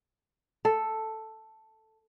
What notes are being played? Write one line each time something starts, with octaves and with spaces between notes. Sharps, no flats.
A4